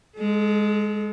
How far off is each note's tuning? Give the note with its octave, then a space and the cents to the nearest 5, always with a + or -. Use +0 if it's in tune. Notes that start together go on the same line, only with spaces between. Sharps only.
G#3 +0 A4 -40